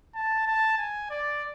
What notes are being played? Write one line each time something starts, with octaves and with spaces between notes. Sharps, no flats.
A5
A5
G#5
D5